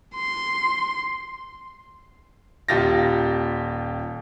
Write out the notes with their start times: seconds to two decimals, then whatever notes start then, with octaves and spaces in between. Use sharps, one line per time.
0.15 C6
2.69 D#1 F4 G4 A6 A#6